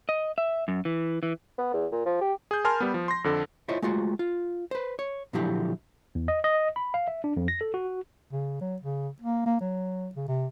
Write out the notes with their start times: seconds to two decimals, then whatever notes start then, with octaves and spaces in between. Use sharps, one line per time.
0.09 D#5
0.38 E5
0.68 F#2
0.85 E3
1.23 E3
1.58 B3
1.74 E2
1.92 A#2
2.06 F3
2.21 G4
2.51 G#4 G6
2.64 A#4 G#5 A5 C6 F6
2.80 G3 B3
2.94 F3
3.08 C6 A#6
3.24 F2 D3 A4
3.69 E4 F4 C5 C#5 D#5
3.82 G#3 A3 F4 F#4
4.19 F4
4.71 B4 C5
4.99 C#5
5.33 A#2 D3 F3 F#3 E4 G4
6.15 E2
6.28 D#5
6.44 D#5
6.76 B5
6.94 F5
7.08 E5
7.24 D4
7.37 F2
7.48 A#6
7.61 A4
7.74 F#4
8.32 C#3
8.61 F#3
8.82 C#3
9.22 A#3
9.46 A#3
9.61 F#3
10.15 C#3
10.28 C3